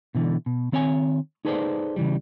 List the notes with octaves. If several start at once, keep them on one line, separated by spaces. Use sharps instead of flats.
B2 D3 E3
B2
D#3 C4 C#5 E5 G#5
D#4 G#4 A4 B4 C5 D5
C#3 E3 G3